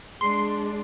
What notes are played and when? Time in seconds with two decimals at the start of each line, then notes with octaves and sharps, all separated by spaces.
0.21 G#3 D4 G#4 C6